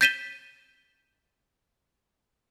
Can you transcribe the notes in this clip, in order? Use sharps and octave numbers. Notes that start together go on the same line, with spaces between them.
G6 A6 B6 D#7 E7 G7